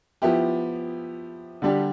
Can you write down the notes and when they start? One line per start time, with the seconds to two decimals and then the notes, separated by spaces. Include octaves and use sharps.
0.22 F3 B3 E4 G4
1.62 D3 G3 D4 G4